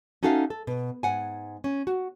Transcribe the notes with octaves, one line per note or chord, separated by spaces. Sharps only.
C#4 D#4 F#4 A4 E5 F5
A4
B2
G#2 F#5 G#5
C#4
F#4